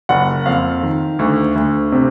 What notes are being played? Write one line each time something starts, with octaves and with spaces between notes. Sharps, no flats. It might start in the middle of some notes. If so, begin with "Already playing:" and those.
F#1 F#5
F2 F5
D#3
D2
D2
C3